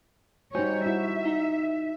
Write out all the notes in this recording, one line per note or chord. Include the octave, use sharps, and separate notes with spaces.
G3 D#4 F#4 C5 C#5 G#5
E4 F#4 E5
D#4